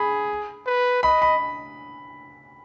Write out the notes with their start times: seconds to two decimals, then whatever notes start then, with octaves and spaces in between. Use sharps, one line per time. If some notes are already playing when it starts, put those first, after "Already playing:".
Already playing: G#4 B5
0.66 B4
1.03 D#5 B5
1.22 B5